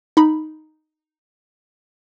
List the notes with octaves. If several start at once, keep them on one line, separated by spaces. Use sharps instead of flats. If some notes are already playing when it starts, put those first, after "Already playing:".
D#4 B5